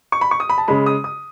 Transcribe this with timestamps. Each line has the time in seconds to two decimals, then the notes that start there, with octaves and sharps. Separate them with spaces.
0.12 C#6
0.21 B5
0.31 C#6
0.40 D#6
0.50 B5
0.58 A5
0.68 C#3 G#3 B5
0.86 D#6
1.04 D#6